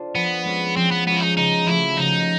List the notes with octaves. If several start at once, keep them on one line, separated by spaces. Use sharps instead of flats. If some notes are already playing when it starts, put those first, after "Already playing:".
Already playing: D4 F4 A4 C5
F3 B3
G#3 C#4 F4
F3 C4
B3
G#3 B3 C#4 F4
E4
D#4
C#3 D#4
F3 A3 C#4 E4 F#4
C#3 D#4